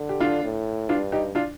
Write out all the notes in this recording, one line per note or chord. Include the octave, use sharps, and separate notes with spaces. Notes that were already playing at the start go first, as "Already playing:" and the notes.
Already playing: D3
G4
D4 F4
A2
G2 D4 F4
D#4 G4
D4 F4